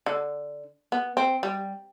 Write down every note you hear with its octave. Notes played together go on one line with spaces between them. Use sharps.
D3
B3
C4
G3